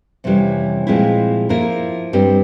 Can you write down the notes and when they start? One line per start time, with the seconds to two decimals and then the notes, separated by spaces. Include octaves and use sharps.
0.24 F2 C3 E3 G3 C#4
0.87 A#2 F3 G#3 C4 E4
1.49 F3 A#3 E4 A#4
2.13 G2 G3 C4